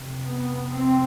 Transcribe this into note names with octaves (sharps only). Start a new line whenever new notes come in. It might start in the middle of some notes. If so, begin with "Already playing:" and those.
Already playing: F2 C3
B3
C4